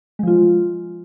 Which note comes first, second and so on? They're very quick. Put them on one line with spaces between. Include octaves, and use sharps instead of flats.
G#3 F3 F4